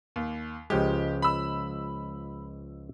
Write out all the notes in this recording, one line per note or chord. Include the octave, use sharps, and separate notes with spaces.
D#2
C#2 F3 G#3 G4
B5 E6